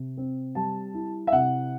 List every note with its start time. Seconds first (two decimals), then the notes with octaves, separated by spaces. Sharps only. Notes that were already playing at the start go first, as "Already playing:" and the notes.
Already playing: C3
0.17 C4
0.55 G3 A5
0.94 E4
1.27 E5
1.32 C3 F#5